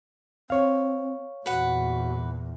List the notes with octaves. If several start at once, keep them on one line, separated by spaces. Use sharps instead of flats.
C4 C#5 F5
E2 A#2 F#4 B4 F#5